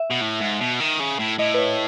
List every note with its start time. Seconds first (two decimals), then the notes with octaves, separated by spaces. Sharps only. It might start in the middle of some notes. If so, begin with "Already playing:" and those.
Already playing: E5
0.10 B2
0.21 A2
0.40 G#2
0.60 B2
0.80 D#3
1.00 C#3
1.20 A2
1.39 A2 D#5
1.54 B4
1.58 C#5